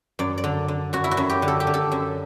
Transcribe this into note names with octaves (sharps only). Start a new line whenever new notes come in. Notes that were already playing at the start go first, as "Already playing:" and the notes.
F#2 D5
D5
D3
D3
F#2 F#4
E4
F#4
F#2
G4
D3
A4
G4
D3
A4
F#2